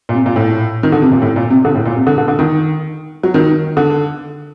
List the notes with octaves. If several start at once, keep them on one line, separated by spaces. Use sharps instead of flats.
A#2
C3
A#2
A2
D#3
D3
C3
A#2
A2
A#2
C3
D3
A2
A#2
C3
D3
D3
D3
D#3
F#3
D#3
D3